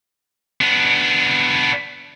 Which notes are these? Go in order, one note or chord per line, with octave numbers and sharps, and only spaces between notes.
B3 D4